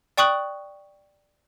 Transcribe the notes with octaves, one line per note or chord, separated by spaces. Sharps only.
D5 G5 C#6 D#6 F#6 F#7